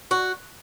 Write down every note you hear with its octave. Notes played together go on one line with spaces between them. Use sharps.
F#4